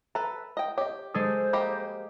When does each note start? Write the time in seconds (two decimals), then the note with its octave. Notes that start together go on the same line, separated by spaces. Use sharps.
0.15 A4 B4 A#5
0.57 D#5 G5
0.78 G4 C#5 D#5
1.14 G#3 G#4 A4 C5 D#6
1.53 A#3 G4 D#5 B5